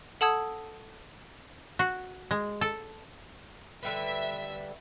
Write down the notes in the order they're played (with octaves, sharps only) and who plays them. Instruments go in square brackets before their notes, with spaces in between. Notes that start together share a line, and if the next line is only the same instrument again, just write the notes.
[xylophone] A4 F#5 A5 D#6 E6 G#6
[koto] F#4
G#3
A4
[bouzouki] D3 G3 B4 [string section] E5